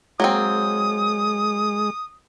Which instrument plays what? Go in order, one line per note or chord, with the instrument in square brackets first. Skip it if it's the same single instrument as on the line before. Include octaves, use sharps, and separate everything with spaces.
[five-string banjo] F#3 A#3 C4 [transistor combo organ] G#3 [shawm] D#6